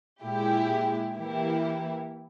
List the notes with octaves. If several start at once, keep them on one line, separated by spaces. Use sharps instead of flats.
A#2 G#3 E4 G4
E3 A#3 E4 G4